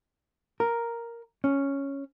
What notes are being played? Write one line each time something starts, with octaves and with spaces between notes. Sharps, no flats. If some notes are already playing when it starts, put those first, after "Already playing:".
A#4
C#4